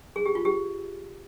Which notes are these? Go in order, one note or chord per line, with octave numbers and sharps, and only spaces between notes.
G#4
G4
F4
G4